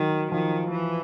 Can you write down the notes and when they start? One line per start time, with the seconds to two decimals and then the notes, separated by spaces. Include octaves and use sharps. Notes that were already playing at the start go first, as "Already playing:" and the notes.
Already playing: D#3 F#3
0.32 D#3 F3
0.71 E3